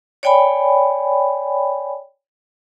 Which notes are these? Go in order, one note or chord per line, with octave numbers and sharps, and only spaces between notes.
C#5 D5 G5 G#5 B5